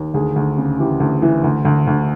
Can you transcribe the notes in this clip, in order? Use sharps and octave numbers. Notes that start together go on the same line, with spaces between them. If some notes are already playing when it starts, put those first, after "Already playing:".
Already playing: D#2
D2 G#4
D2
C#3
E3 G4
D2
E3
D2
D2
D2